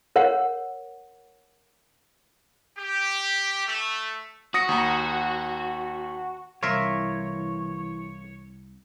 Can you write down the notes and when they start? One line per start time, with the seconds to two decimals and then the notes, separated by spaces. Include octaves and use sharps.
0.16 A#4 C#5 F#5
2.78 G4
3.67 A3
4.54 F#4 D#6 A#6 C#7
4.69 D#2 A#5
6.63 C2 E3 F4 A#4 C#5 E5